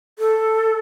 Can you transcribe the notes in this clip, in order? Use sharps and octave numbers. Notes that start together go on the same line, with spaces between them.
A4